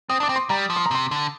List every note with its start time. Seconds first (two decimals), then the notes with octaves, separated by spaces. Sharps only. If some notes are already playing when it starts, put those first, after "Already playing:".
0.10 C4 D#6
0.20 D4
0.23 D6
0.29 C4
0.36 C6
0.50 G3 A#5
0.70 F3
0.76 C6
0.86 A#5
0.91 C3 C6
1.11 D3